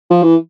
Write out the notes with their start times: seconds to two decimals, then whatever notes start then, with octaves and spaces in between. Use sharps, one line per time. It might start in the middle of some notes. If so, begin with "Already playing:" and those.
0.11 F3
0.23 E3